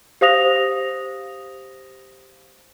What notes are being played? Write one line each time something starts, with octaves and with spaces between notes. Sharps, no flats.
G4 C5 F5 D#6 A#6 F7